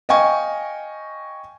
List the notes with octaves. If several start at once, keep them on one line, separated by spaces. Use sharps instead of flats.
D#5 F5 G5 G#5 C#6